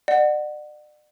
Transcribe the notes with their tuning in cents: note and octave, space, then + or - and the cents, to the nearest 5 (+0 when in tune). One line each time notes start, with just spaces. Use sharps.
D5 +40 F#5 +0